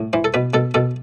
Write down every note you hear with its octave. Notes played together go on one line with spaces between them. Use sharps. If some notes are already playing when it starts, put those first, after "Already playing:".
Already playing: A2
E3 C5
A4
B2 B4
B2 A4
B2 A4